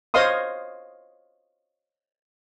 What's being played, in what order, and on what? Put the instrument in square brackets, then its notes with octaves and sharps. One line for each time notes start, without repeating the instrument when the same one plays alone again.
[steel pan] C5 C#5 D#5 F5 C6 D#6